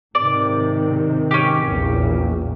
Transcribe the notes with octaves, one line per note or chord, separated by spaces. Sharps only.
G#2 C3 D#3 D5
C#4 G4
A#1 E2 A#2